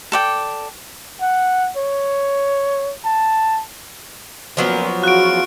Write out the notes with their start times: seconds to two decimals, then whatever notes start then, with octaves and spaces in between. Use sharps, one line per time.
0.12 A4 D5 G5
1.22 F#5
1.77 C#5
3.05 A5
4.57 F#2 A#2 F3 F#3 B3
5.03 E2 C#4 F4 F#4 F#6 D7